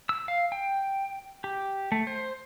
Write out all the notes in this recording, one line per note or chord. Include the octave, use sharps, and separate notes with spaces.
E6
F5
G5
G4
A3
C5